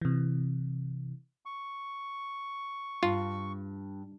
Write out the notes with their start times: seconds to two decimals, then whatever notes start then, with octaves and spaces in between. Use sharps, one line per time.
0.01 C3 E3
1.45 C#6
3.03 G2 F4